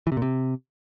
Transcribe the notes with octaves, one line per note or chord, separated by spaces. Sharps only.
E3
C3
A#2
C3